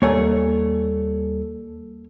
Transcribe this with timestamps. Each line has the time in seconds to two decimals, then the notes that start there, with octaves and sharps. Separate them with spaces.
0.02 D#2 G3 A#3 A4 C#5 G#5